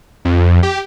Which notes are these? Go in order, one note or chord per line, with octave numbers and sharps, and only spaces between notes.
F2
G4